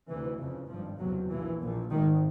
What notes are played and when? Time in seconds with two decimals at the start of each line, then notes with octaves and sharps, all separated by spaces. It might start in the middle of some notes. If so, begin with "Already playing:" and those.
0.08 D2 C3 E3
0.38 F1 F2 C#3
0.68 G#1 G2 F3
0.99 F#1 E2 C3 F#3
1.30 A#1 A#2 E3
1.61 A#1 A#2
1.91 G#1 G#2 D#3